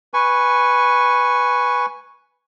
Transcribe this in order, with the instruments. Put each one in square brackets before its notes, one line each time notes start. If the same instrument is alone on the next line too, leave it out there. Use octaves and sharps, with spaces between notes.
[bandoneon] B4 G#5 C#6